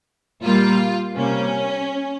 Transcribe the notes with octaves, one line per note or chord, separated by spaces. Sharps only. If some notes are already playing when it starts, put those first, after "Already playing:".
A#2 G3 A#3 F4
C3 G3 A#3 C#4